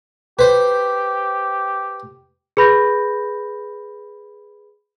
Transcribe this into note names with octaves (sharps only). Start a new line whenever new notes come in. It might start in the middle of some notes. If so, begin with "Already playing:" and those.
G4 B4 C5
G#4 B4 B5 G6 A#6